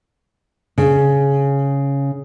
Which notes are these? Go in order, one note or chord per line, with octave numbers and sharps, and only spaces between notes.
C#3